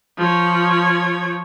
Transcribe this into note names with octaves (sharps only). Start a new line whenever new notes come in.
F3 C#5